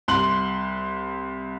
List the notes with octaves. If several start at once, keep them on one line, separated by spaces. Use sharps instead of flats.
C2 C6 F#6 F#7